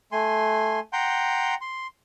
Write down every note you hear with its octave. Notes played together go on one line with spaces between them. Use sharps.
A3 G#5 C6
F#5 G5 A#5 C6 G6
C6